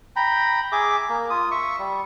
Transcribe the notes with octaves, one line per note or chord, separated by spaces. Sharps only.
G5 A#5 B5
G#4 E5 D6
A#3
F4 D#6
E5 C#6
G3